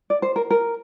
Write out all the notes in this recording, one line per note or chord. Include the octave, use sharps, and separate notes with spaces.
D5
C5
A#4
A#4